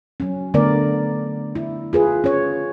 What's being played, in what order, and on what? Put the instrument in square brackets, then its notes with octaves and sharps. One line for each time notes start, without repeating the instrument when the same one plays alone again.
[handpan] F#3 C#4
D3 A3 B3 A#4 D5
E4
F4 G#4 B4
C#4 C#5